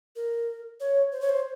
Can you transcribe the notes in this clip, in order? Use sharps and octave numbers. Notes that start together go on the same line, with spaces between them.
A#4
C#5
C5
C#5
C5